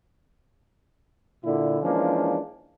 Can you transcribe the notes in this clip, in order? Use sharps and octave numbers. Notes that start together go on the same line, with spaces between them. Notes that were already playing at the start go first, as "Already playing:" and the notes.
A#2 D3 E4
E3 F3 G#3 A#3 C#4 D4